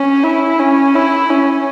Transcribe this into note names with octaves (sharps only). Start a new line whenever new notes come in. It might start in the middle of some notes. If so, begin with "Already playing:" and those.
Already playing: C#4
E4
C#4
E4
C#4